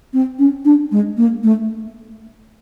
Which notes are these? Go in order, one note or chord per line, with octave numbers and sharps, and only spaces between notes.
C4
C#4
D4
G#3
A#3
A3